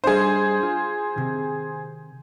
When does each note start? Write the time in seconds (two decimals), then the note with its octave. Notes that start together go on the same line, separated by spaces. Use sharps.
0.04 G3 D4 D#4 G#4 C5
0.63 F4
1.16 C3 D#3